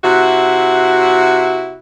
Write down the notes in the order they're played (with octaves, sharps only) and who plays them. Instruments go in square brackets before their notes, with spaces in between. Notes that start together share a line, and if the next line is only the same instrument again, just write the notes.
[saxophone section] C3 E4 F#4